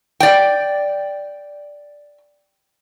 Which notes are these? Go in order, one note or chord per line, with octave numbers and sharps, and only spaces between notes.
D5 G5